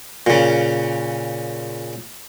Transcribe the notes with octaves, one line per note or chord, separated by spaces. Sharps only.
A#2 C#3